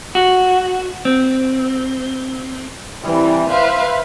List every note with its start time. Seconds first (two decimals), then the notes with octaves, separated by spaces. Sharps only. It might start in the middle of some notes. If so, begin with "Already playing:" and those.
0.15 F#4
1.05 C4
3.00 C3 E3 G3
3.50 B4 C5 E5 F5